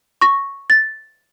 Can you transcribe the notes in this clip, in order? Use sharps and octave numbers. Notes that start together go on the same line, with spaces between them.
C#6 A#6
A6